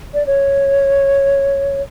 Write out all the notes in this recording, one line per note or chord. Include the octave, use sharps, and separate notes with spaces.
D5
C#5